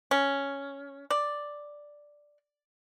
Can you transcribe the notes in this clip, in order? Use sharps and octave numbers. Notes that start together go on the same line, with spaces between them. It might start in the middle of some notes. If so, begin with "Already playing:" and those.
C#4
D5